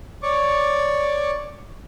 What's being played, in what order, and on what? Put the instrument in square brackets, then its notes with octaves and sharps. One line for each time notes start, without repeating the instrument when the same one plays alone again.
[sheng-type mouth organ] C#5 D5 C#6 D6